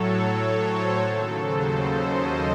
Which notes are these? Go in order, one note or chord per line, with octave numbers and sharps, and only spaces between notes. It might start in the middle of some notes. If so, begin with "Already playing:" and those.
Already playing: A2 F#3 A4 C#5
C#5
C5
D#2 C#3 F#3 A4
C5
D#5